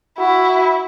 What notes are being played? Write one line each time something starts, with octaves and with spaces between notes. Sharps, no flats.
E4 F#4